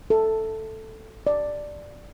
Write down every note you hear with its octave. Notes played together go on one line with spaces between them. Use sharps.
A4
D5